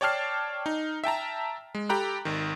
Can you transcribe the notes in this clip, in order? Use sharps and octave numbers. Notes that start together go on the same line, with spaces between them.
C#5 D5 G5 A5 F6 C7
D#4
E5 G5 A5 A#5
G#3
G4 A4 G5 A#5 B5 F#6
G#1 D#3